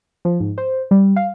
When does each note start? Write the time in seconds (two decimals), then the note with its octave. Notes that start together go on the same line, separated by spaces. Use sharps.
0.25 F3
0.40 G#2
0.58 C5
0.91 G3
1.16 F5